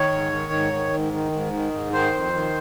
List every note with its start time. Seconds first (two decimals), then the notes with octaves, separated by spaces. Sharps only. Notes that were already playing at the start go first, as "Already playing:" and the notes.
Already playing: D#3 C#5
0.12 G#2
0.33 D#3
0.52 G#2
0.73 D#3
0.93 G#2
1.13 D#3
1.32 G#2
1.53 D#3
1.73 G#2
1.93 D#3 C5
2.13 F2
2.33 D#3